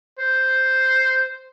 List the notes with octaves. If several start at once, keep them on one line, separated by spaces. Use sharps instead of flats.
C5